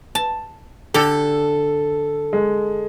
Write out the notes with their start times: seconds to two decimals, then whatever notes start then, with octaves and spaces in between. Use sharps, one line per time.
0.15 A5
0.94 D3 G4 A4
2.33 G#3